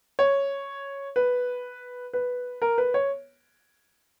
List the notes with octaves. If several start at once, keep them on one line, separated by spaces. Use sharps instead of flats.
C#5
B4
B4
A#4
B4
C#5